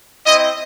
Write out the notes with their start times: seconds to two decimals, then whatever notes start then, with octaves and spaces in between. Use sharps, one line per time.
0.26 C4 E4 D#5